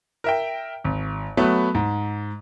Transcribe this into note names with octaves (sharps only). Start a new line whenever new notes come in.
A#4 E5 G5
G#1
F#3 A3 B3 B4
G#2